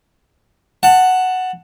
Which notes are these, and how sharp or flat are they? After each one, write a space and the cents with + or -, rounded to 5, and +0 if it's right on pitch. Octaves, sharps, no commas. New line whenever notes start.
F#5 +0 A5 +20